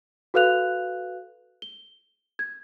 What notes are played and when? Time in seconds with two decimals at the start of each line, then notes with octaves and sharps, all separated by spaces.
0.34 F#4 A4 B4 F5 F#6 F7
1.62 G7
2.39 G#6